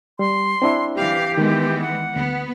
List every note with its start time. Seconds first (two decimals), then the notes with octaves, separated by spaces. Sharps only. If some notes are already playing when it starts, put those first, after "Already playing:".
0.19 G3 C6
0.62 C4 D4 E4
0.95 E3 G4 F5
1.37 D#3 E3 G#3 B3
1.81 F#5
2.16 D2 B3